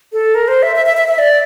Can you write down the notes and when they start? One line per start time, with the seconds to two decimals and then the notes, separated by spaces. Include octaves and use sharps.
0.13 A4
0.35 A#4
0.48 C5
0.63 E5
0.76 E5
0.86 E5
0.97 E5
1.08 E5
1.18 D5